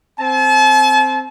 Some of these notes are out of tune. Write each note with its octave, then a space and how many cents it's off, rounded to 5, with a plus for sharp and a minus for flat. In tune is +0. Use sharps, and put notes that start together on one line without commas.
C4 +0 A5 -40